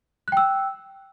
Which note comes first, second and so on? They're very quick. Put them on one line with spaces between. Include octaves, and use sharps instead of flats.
F#6 G5 E6